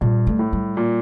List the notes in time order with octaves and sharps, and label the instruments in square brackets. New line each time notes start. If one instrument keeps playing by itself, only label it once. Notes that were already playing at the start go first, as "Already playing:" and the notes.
[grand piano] G2 [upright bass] A#2
[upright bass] A3
[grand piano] A2
[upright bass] G3
[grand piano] A#2